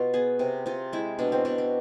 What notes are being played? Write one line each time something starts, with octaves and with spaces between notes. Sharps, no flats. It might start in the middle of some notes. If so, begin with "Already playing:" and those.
Already playing: B2 F4
B3 G#4
C3
C3 F4
G#3 E4
B2 D4
C4
B2 D4
C4